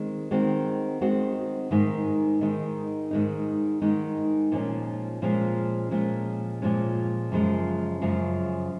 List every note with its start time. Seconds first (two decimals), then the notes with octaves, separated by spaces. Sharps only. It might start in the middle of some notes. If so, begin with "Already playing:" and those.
Already playing: D#3 G#3 C4
0.31 D#3 G#3 C4 F#4
1.01 D#3 G#3 C4 F#4
1.71 G#2 D#3 G#3 D#4
2.41 G#2 D#3 G#3 D#4
3.11 G#2 D#3 G#3 D#4
3.82 G#2 D#3 G#3 D#4
4.52 A#2 F3 G#3 C#4
5.22 A#2 F3 G#3 C#4
5.91 A#2 F3 G#3 C#4
6.62 A#2 F3 G#3 C#4
7.32 F#2 C#3 F3 G#3
8.01 F#2 C#3 F3 G#3